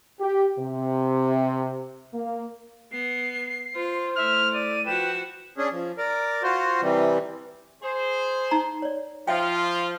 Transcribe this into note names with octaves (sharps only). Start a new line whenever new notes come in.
G4
C3
A#3
B3 C7
F4 C5
A3 E4 E5 F6
D5 D#7
F3 F#4 B4 G5 E7
C#4 D4 G#4
F3
A#4 D5
F4 F#4 C5
C3 E3 G3
G#4 C5
D#4 A5 A#5
C#5 D5
F3 F4 E5 F5 G5